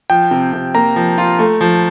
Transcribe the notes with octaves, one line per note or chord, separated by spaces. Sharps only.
F3 G5
C3
C3
A#3 A#5
F3
F4
A3
F3